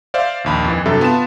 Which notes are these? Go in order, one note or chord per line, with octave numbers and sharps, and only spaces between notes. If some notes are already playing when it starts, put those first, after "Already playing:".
C5 D5 E5 F5
A#1 D#2 B5
F2 E3
G2 C3 F#3 A4 E5
B3 F4 A5 E7